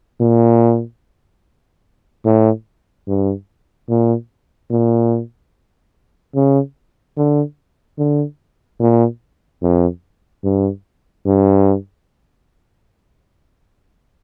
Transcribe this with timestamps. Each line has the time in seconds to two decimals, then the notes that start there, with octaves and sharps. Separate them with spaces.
0.21 A#2
2.25 A2
3.08 G2
3.89 A#2
4.71 A#2
6.35 C#3
7.17 D3
7.99 D3
8.80 A#2
9.62 F2
10.44 G2
11.26 G2